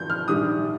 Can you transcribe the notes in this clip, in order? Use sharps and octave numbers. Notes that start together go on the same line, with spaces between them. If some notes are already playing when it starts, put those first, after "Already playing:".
Already playing: F3 G6
F6
A#1 G#2 D#3 G3 D4 D#6